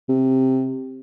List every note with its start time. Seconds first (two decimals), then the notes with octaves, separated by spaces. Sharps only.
0.09 C3